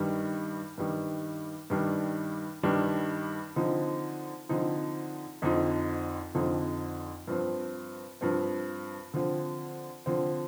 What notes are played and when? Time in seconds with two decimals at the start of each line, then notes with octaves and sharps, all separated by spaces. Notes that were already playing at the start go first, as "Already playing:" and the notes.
Already playing: G2 D#3 G3
0.78 G2 D#3 G3
1.70 G2 D#3 G3 D4
2.63 G2 D#3 G3 D4
3.56 D3 F3 C4 D#4
4.49 D3 F3 C4 D#4
5.42 F2 D3 F3 C4 D#4
6.35 F2 D3 F3 C4 D#4
7.28 G2 F3 C4
8.21 G2 F3 C4
9.14 D3 F3 C4
10.06 D3 F3 C4